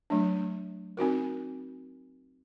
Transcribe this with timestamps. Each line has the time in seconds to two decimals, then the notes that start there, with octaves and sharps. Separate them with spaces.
0.10 F#3 A3 D4
0.97 C4 D#4 F#4 A#4